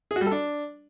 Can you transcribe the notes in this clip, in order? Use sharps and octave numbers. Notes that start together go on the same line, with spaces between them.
G#4
F#4
G3
A4
D4